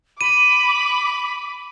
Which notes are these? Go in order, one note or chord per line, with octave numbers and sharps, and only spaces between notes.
B5 D6 D#7